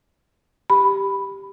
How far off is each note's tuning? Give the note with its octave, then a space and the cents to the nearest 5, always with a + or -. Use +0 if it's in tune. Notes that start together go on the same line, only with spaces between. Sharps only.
G4 +0 B5 +0